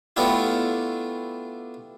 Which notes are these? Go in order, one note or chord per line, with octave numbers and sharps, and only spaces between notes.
A3 B3 D4 E4 F4 G4